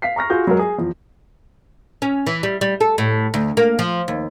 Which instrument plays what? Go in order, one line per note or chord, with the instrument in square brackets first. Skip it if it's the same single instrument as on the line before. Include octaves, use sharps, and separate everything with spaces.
[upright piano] F5 B6 C7
A#5 C#6 F6 A#6
F4 F#4 G#4 G6
F#3 G#3 F#4 A#4
G#4
E2 F3
[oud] C#4
E3
G3
G3
A4
A2
D2
A#3
F3
D#2